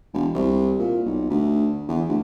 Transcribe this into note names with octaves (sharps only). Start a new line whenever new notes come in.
E1
C2
A#2
B1
D2
E2
D2